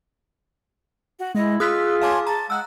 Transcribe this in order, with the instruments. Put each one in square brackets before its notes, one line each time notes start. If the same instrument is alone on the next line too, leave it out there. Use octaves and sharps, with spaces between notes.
[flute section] F#4
[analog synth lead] G#3 [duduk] E4 [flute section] D#5
[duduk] F4 [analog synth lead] G#4 [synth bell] D#6 F#6 B6 [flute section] E6
[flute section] C#5 G#5 C6 [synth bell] F5 A5 D6
[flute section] A5 [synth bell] A#5
[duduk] G#3 [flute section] F#5 [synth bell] E6 F#6